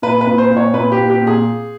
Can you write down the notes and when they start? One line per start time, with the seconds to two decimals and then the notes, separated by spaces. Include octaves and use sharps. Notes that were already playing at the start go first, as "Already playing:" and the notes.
0.02 A#2 B4
0.21 B4
0.27 A#2
0.38 C5
0.50 A#2
0.56 C#5
0.73 A#2 B4
0.92 G4
0.98 A#2
1.10 G4
1.22 A#2
1.27 G#4